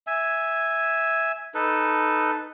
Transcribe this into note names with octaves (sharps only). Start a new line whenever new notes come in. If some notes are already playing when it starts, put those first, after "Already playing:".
E5 G#5
D#4 A4 B4